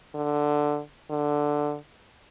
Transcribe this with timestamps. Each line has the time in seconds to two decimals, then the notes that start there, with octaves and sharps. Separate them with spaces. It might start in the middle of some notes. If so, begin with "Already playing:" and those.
0.15 D3
1.10 D3